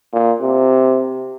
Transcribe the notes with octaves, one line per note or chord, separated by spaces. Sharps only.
A#2
C3